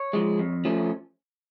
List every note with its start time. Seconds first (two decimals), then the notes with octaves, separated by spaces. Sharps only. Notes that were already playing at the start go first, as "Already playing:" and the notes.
Already playing: C#5
0.13 F3 G#3
0.39 F2
0.65 F3 A3 C#4